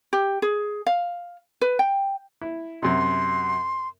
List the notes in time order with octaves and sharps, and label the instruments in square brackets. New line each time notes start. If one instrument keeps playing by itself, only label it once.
[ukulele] G4
G#4
F5
B4
G5
[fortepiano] E4
[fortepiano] F#2 C3 [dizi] C6